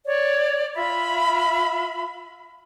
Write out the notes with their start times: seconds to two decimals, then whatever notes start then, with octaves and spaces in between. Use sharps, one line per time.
0.06 C#5 D5
0.75 F4 E5 B5